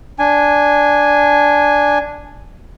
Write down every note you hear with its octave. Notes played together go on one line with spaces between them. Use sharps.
D4 G#5